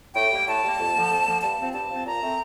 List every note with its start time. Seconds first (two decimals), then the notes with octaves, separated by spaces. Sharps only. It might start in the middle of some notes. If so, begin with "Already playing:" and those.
0.15 A2 G5
0.32 G3 A#3
0.48 A2 A5
0.64 G3 A#3
0.80 F2
0.95 D3 F3 A#3
1.11 F2
1.27 D3 F3 A#3
1.43 G2 A5
1.59 F3 C4
1.74 G2 A5
1.90 F3 C4
2.06 A#2 A#5
2.22 A3 C4